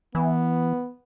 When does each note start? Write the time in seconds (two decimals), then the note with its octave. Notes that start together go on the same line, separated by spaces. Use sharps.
0.15 E3 B3